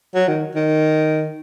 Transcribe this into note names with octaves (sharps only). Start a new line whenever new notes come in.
F#3
D#3
D#3